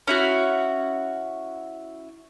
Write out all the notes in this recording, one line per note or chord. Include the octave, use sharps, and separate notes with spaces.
C#4 E4 F#4